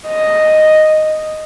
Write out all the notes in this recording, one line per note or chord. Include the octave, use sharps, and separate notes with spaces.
D#5